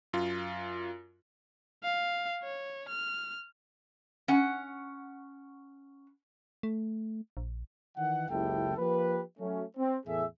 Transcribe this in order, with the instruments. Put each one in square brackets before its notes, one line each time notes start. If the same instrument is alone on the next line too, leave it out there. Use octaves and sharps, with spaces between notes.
[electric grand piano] F#2 F4
[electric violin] F5
C#5
F6
[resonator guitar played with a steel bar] C#4 F#5
[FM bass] A3
A#1
[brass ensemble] D#3 E3 F#5
F#1 C#2 E4 G4 A4 G5
F3 A#3 G4 B4
F#3 A3 C#4
C4
E2 A2 A3 G#4 E5